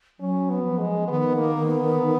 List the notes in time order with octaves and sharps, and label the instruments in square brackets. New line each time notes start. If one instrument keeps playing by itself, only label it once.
[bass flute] F#3 [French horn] C#4
[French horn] B3
[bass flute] F3
[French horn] G#3
[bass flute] D#3 [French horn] B3
[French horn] A#3
B3